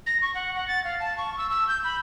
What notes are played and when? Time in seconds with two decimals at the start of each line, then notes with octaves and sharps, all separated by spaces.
0.06 A#6
0.22 C#6
0.35 F#5
0.56 F#5
0.68 A6
0.84 F5
1.00 A5
1.18 C#6
1.38 E6
1.50 E6
1.68 G6
1.84 B5